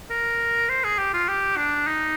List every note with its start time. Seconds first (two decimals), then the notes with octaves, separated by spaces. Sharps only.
0.10 A#4
0.69 C5
0.84 G#4
0.98 G4
1.14 F4
1.28 G4
1.57 D4
1.87 D#4